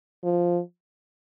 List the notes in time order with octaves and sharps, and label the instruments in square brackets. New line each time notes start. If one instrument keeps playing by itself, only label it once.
[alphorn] F3